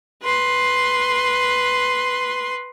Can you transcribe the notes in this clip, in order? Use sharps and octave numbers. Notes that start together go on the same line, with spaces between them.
B4 C6